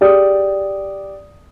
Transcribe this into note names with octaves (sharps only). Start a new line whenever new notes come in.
G4 G#4 D5 D#6